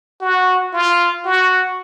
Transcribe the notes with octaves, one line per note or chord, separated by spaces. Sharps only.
F#4
F4
F#4